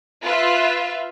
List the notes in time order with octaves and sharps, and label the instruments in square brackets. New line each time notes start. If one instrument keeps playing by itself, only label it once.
[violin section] F4 B4 E5